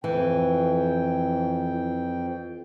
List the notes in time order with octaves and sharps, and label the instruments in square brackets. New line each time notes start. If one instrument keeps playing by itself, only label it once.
[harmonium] F2 G5 [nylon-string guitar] E3